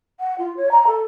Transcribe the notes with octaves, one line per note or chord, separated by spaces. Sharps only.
F#5
F4
C#5
A#5
A4